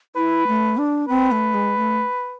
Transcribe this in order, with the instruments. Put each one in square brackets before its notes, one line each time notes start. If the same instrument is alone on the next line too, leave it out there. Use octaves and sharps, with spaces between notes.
[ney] E4 [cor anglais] B4
[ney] A3
D4
[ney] C4 [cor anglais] B4
[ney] A3
G#3
A3